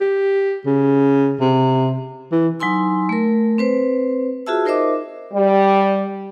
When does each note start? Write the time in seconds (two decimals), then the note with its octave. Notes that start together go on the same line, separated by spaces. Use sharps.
0.01 G4
0.66 C#3
1.41 C3
2.32 E3
2.60 F#3 D#4 G#5 C6 E6
3.09 A3 A#4
3.58 C4 B4 C5
4.47 F4 F#4 G#4 E5 A5 E6
4.66 D#4 A#4 C5 D#5 E5 D6
5.33 G3